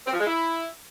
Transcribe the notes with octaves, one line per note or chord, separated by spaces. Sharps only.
C4
F3
G#3
E4